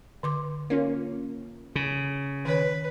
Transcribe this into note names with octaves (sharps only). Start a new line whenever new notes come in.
D3 C6 D6
A#3 C#4 F4
C#3
D#3 B4 C#5